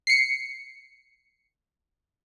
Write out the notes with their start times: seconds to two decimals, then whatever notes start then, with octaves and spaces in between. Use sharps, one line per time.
0.07 C7 C#7